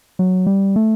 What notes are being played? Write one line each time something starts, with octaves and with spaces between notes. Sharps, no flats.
F#3
G3
A3